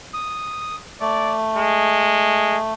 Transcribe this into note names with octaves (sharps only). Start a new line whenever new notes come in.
D#6
A3 D5
G#3